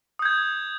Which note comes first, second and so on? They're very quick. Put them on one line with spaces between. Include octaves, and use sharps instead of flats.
D#6 G6 G#6